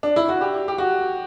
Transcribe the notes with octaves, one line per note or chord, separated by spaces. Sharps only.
D4
E4
F#4
G4
G4
F#4